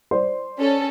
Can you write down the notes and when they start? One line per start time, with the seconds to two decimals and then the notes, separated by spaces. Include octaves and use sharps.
0.11 C5 D5 C6
0.57 C#4 A4